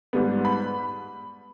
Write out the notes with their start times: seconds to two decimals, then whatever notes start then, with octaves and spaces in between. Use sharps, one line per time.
0.13 G#2 G3 B3
0.45 B5